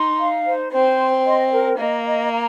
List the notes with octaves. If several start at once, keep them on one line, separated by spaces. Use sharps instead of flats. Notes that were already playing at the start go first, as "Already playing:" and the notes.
Already playing: D#4 C6
F5
C5
C4 C5
C6
D#5
A#4
A#3 D#5
D#5
A#5